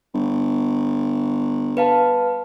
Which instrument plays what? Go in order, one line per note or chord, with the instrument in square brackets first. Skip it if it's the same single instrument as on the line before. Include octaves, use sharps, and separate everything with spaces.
[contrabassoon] G1
[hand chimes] B4 F5 A5